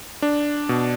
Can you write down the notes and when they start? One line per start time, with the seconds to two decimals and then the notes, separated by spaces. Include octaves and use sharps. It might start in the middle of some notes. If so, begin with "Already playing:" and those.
0.22 D4
0.69 B2